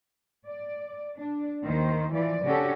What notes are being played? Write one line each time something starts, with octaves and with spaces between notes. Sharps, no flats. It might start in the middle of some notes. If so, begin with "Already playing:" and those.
D5
D4
D#2 D#3 C5
E3 F3 D5
C#3 C#4 D4 F#4 G4 A4